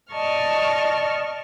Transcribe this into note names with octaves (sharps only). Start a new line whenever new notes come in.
D5 D#5 A5 C#6 F6